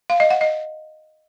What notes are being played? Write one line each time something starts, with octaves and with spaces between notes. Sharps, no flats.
F5
D#5
F#5
D#5